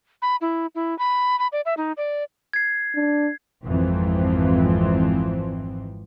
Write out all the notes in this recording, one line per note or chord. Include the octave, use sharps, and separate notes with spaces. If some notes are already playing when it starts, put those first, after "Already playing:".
B5
E4
E4
B5
B5
D5
E5
D#4
D5
G#6 C7
D4
G#1 F2 G#2 E3 F3 C4